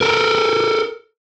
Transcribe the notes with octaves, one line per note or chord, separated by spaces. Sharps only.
A4 A#4